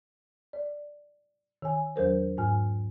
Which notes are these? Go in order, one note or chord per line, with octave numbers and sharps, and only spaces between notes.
D5
D#3 G#5
E2 F#3 A#4 C5
G#2 G#5 F6